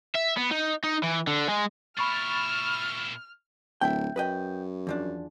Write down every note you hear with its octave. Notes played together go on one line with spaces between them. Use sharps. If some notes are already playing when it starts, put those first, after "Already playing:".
E5
B3
D#4
D#4
E3
D3
G#3
A#2 E4 B5 C#6 F6 A6
D1 E5 G5
F#2 B4 D#5 G5
E2 F3 D4